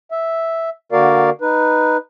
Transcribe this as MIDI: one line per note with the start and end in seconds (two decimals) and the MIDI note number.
0.12 0.70 76
0.92 1.30 50
0.92 1.30 58
0.92 1.30 66
0.92 1.30 70
0.92 1.30 74
0.92 1.30 77
1.41 1.97 63
1.41 1.97 71